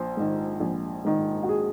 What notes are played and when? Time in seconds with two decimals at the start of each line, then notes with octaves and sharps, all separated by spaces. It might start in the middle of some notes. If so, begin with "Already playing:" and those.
Already playing: A#1 C5
0.17 G#2 D#3
0.60 A#1
1.05 G#2 D#3
1.43 F#4
1.49 G#4